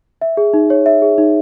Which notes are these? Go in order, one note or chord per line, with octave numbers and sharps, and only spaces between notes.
E5
G#4
D#4
C#5
E5
G#4
D#4